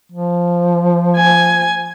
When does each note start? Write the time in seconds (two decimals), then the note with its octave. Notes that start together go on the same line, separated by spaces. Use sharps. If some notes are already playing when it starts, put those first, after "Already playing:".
0.12 F3
1.17 G#5